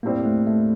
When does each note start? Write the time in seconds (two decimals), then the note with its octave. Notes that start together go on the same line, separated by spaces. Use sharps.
0.03 A2 G3 A#3 C4
0.25 A3
0.47 A3